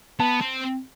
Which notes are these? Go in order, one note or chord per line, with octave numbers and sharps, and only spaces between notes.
B3 A5
C4